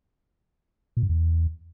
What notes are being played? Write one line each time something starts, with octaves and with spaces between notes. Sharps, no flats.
A#2
G2
E2